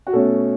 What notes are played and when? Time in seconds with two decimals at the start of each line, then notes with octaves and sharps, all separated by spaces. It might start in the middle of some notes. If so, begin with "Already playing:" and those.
0.07 F#4
0.13 B2 A3 C#4 A4